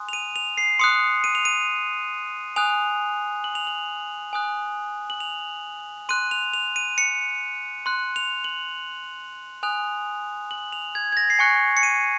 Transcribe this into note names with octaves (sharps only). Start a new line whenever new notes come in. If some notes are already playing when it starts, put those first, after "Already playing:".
Already playing: G#5 C6 D#6 F#6
F7
D#7
F7
C7
C6 D#6 F#6 C#7
D#7
F7
D#7
G#5 D#6 F#6 F7
F#7
F7
F#7
G#5 D#6 F#6
F#7
F7
C6 F#6 D#7
F7
F7
D#7
C#7
C6 F#6
F7
F#7
G#5 D#6 F#6 F7
F#7
F7
G#6
G#6
A#6
C7
G#5 C#6 F#6 C#7
C#7
D#7